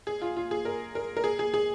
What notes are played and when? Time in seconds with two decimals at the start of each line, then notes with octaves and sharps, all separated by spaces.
0.07 G#4
0.22 F4
0.37 F4
0.51 G#4
0.65 A#4
0.95 A#4
1.17 A#4
1.24 G#4
1.39 G#4
1.54 G#4